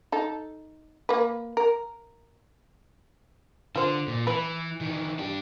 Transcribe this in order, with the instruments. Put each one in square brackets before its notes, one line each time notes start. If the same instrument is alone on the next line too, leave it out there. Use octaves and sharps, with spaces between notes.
[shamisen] D#4 A4
A#3 B4
A#4
[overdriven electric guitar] D3 [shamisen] F4 C5
[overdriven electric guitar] A#2
[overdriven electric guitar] E3 [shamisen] B4
[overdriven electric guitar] D#3 E3
D4 G4